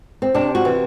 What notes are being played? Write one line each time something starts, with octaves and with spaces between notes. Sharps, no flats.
C4
C3 D4
F#4
E3